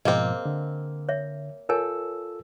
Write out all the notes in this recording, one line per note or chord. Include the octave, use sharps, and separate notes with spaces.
G#2 B2 F3 A#3 C4 G#4 D#5
D3
C#5 E5
F4 A4 A#4 C#5 G#5 E6